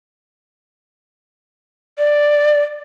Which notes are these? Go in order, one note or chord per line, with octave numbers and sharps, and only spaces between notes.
D5